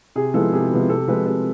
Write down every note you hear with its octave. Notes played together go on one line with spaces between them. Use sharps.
C3 G#4
F3 G#3 B3 E4 A4
C3 G#4
F3 G#3 B3 E4
C3 A4
F3 G#3 B4
C3 A4